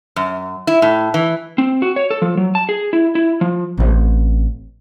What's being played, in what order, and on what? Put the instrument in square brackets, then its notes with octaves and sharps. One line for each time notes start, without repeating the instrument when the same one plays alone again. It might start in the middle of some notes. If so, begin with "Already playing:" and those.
[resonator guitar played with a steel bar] F#2
E4
A2
E3
[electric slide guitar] C4
F#4
C#5
A4
F3
F#3
A5
G#4
E4
E4
F3
[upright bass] A1 C4